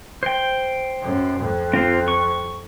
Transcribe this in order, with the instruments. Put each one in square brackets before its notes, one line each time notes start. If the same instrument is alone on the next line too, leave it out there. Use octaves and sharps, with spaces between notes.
[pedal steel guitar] C5 G5
[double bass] F#2
F2
[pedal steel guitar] C4 F4 C5
C#6